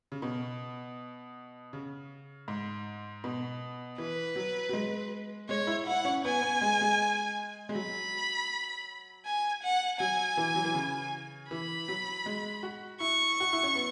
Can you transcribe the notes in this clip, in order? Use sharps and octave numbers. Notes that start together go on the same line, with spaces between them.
C#3
B2
C#3
G#2
B2
E3 B4
F#3
F#3
G#3
G#3 C#5
E4
E4 F#5
C#4
B3 G#5
B3
G#3
G#3
G#3
F#3 B5
G#5
F#5
F#3 G#5
E3
F#3
E3
C#3
E3 B5
F#3
G#3
F#4
E4 C#6
F#4
E4
C#4
B3